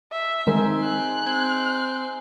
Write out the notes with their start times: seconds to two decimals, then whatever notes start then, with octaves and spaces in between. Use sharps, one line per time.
0.12 E5
0.47 D#3 G#3 C4 D#4 A#4 G#5
0.84 G#4 F#6
1.26 C4 G#6